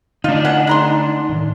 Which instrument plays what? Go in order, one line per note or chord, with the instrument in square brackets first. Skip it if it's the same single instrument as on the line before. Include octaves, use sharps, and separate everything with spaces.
[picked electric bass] D3 A3 [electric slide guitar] D4 D#4 [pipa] F4
[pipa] C#4 F#5
G#3 A#5 C6
[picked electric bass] A2 D#3